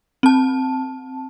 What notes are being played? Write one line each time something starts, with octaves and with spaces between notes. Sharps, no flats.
C4 A5